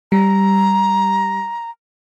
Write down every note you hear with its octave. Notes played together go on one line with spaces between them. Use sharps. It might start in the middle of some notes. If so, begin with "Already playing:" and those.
G3 A#5